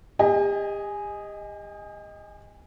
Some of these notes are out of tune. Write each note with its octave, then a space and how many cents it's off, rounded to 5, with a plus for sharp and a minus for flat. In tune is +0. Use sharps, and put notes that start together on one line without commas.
G4 +40 D#5 +0 G#5 +0